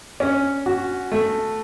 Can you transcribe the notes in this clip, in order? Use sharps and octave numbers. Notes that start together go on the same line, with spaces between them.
C#4
F#4
A3